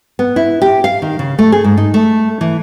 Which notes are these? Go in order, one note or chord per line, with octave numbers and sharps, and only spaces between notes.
B3
E4
G4
F5
D#3
C#3
A3
G#4
G#2
D#4
A3
E3